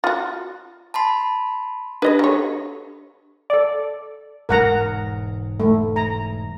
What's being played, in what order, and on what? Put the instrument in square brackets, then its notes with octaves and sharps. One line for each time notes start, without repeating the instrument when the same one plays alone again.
[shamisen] F4 F#4
[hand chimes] A5 B5 C6
[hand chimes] D4 G4 A4 [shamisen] B4 D#5
[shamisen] F#3 C#5
[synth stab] A4 D5
[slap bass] E1 G#2 G#3 [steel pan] A#4 F#5 A#5
[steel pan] A3
A#5